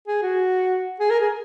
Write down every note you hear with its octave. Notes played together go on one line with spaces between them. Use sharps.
G#4
F#4
G#4
A#4
G#4